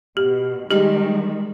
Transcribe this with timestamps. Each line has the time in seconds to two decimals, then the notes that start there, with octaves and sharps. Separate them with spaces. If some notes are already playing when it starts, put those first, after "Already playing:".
0.17 B2 G4
0.71 D#3 G3 G#3 D#4 G4